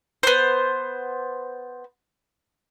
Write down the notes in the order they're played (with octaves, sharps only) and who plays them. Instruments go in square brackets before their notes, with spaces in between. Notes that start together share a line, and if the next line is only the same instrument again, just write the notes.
[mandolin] B3 C5